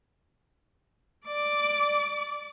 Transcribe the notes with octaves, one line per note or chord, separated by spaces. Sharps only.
D5 D6